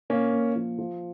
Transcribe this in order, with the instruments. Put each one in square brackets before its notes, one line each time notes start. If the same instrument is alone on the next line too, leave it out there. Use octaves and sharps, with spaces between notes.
[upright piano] A#2 [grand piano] A#3 C#4
[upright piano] A#2
F3
F3